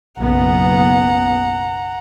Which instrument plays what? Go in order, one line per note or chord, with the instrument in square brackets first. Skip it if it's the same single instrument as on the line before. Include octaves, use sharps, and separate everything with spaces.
[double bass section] F#1 B1 B3 [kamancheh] F#5 A#5